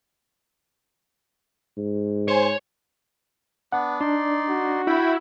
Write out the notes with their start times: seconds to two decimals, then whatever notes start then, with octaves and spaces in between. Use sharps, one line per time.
1.77 G#2
2.28 C5 C#5 G#5
3.72 B3 D4 F#5
4.01 D4 D#4 D5 C6
4.49 F#4
4.87 E4 G5 B5